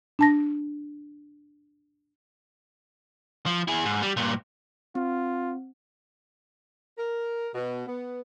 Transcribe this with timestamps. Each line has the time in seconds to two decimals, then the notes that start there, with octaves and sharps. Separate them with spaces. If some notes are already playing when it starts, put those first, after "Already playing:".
0.19 D4 A5 A#6
3.46 F3
3.68 E4 G#4
3.85 G#2
4.02 G3
4.17 G2 A#2
4.95 C4 F4
6.98 A#4
7.55 B2
7.87 B3